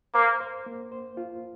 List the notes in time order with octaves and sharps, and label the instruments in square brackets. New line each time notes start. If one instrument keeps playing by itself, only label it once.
[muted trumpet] A#3 [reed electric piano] C5
[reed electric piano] C5
A#3
C5
F4